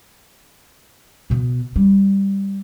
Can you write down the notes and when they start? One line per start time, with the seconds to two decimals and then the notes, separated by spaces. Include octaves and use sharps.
1.30 B2 B3
1.76 G3